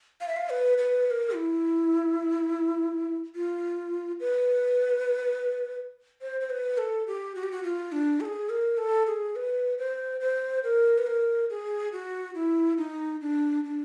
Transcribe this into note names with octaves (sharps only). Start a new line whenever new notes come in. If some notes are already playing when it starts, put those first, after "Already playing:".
F5
E5
F5
B4
B4
B4
A#4
E4
F4
B4
C5
C5
B4
A4
G4
F#4
G4
F#4
F4
D4
A4
G#4
A#4
A4
G#4
B4
C5
C5
A#4
B4
A#4
G#4
F#4
E4
D#4
D4
D4